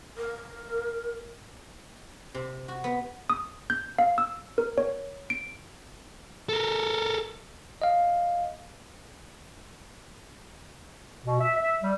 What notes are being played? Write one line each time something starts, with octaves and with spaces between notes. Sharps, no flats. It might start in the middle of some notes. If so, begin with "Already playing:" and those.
A#4
C3
F#4
B3
D#6
G6
F5
E6
A#4
C#5
D7
A4 A#4
D#5 F5
B2
E5
E5
G3